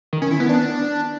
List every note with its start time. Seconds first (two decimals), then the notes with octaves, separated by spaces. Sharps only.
0.13 D#3
0.22 C#4
0.31 E4
0.40 B3
0.49 D4